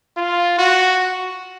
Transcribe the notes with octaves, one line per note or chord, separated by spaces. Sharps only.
F4
F#4